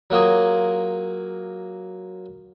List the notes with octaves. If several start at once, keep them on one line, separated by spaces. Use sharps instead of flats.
F#3 A#3 F4 G#4